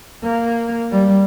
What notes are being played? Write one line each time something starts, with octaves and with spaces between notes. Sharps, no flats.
A#3
G3